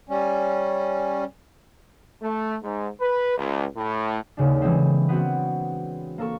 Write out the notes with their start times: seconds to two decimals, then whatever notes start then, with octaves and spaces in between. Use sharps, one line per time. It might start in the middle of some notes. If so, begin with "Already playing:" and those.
0.09 G3 C#4
2.23 A3
2.64 G#2
3.01 B4
3.37 C#2
3.77 A2
4.37 D#2 C#3 D4
4.62 E3 G#3 C4
5.09 B3 C4 F#4
6.18 A#3 A4 C#6